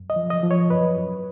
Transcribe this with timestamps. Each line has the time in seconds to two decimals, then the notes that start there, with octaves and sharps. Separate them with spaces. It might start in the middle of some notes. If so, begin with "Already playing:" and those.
Already playing: F#2
0.10 D#5
0.16 F3
0.30 D#5
0.43 F3
0.51 C#5
0.70 F#2 B4
0.97 F#2